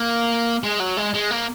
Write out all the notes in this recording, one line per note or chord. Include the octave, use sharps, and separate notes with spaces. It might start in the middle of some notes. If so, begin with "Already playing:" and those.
Already playing: A#3
G#3
F#3
G#3
G#3
A#3